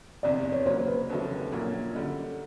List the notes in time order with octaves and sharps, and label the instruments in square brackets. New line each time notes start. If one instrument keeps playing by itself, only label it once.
[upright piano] F1 E2 C3 [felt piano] D5
[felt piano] C#5
[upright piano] C#3 F#3 A#3 [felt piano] C5
[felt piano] B4
[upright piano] F1 D#2 C#3 F#3 A3
A#1 A#2 F#3 A#3 C#4
F#2 D3 G3